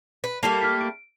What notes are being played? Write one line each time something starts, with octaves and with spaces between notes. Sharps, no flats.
B4
G3 A3 A#3 A5 C7 F7
F6 B6
D7